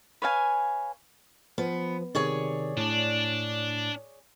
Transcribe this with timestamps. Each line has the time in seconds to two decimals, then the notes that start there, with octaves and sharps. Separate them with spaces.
0.22 B4 C#5 F5 G#5
1.58 F3 B3
2.15 C3 D#3 G#4 C#5 D5
2.77 A2 D4